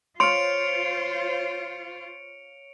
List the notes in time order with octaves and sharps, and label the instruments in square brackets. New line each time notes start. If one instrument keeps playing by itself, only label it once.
[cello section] F4 C5 [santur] C#5 F5 [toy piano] C6 [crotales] C#7 D7 F7